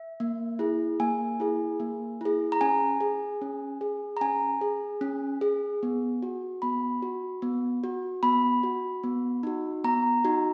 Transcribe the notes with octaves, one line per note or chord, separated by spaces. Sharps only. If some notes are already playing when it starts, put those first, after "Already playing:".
Already playing: E5
A#3
E4 G#4
A#3 G#5
E4 G#4
A#3
E4 G#4
A#5
C#4 G#5
G#4
C#4
G#4
A#5
C#4 G#5
G#4
C#4
G#4
B3
F#4
B3 B5
F#4
B3
F#4
B3 B5
F#4
B3
D#4 F#4
B3 A#5
D#4 F#4